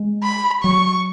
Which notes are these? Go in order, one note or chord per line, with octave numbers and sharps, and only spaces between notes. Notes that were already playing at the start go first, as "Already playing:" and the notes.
Already playing: G#3
B5
F#3 C#6